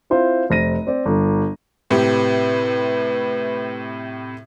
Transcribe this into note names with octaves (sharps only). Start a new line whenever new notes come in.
C4 E4 F4 C5
F1 C5 A#6 D#7
C4 D5
G1
A2 C3 G4 B4